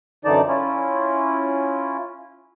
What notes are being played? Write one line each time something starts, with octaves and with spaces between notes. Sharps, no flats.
F#2 D3 E3 D#4 D5 A5
C#4 E4 F4